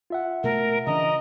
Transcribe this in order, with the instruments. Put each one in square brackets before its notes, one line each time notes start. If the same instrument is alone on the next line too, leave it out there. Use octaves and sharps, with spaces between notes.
[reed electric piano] F4 E5 F#5
[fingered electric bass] B2 A3 [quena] A#4
[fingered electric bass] C#3 E3 D4 [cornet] D#5 [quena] A#5